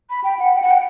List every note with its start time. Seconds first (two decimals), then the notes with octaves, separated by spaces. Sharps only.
0.10 B5
0.24 G5
0.39 F#5
0.54 G5
0.62 F#5
0.71 G5